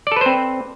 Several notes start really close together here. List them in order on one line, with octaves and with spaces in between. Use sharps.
D5 A4 B4 C5 C4